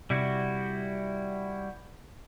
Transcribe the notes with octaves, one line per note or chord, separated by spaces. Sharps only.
C3 G3 E4 F#4